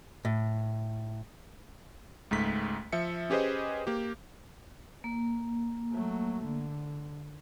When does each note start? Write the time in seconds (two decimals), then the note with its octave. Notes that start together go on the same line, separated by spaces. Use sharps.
0.25 A2
2.31 C#2 G#2 A3 B6
2.92 F3 E5 C#7
3.30 C#4 G4 G#4 B4 C5 D#5
3.87 A#3 G4
5.04 A#3
5.91 F#3 A3
6.44 D3